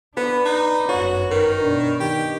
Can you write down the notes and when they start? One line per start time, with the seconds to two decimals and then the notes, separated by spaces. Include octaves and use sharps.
0.17 B3 D4 B4
0.46 D#4
0.89 G1 F#2 F#4 C#5
1.31 D#3 A#4
1.61 B2 D4
2.00 D#3 G4